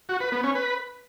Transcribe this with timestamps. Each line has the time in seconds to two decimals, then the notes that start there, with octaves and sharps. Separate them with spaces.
0.09 F#4
0.20 B4
0.32 B3
0.44 C#4
0.55 B4